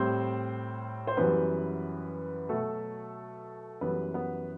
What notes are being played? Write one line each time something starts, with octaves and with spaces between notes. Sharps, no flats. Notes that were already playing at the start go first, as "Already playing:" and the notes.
Already playing: A2 G3 C4 C5
C5
F#2 E3 G3 B3 B4
B2 F#3 A3 A4
F#2 E3 G3 B3 B4
B3 B4